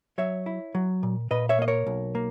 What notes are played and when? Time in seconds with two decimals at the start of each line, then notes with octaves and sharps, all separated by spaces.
0.18 F#3 C#5 E5
0.46 E4
0.75 F#3
1.03 A#2
1.31 A#2 B4 D#5
1.49 C#5 E5
1.59 A#3 D#5
1.68 A#4 C#5
1.86 B1
2.15 A#3